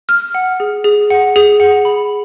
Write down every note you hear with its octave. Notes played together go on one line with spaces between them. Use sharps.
F6
F#5
G#4
G#4
F#5
G#4
F#5
B5